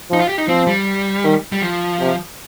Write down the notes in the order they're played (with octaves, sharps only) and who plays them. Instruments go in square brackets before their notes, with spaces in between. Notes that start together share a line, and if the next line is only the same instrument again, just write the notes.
[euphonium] F3 [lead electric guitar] D#4
[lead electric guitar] F4
G4
D#4
[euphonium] F3 [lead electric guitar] C4
[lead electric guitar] G3
[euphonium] D#3
[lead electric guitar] G3
F3
[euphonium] C3